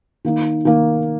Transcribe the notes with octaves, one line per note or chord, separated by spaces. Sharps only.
D#3 A#3 D#4
D#3 A#3 D#4